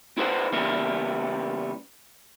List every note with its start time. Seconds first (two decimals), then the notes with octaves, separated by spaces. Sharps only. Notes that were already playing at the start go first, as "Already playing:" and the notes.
0.18 E4 G#4 B4 C5 F#5
0.52 C#3 E3 G3 A#3 B3 E4